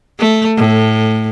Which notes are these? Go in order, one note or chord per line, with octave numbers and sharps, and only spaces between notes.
A3
A2